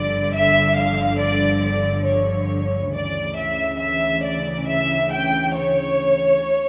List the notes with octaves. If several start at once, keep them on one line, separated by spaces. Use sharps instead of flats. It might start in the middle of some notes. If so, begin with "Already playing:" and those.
Already playing: G1 G2 D3 F3 D5
E5
F5
D5
D5
C#5
D2 C#3 E3 D5
E5
E5
D5
E5
G5
C#5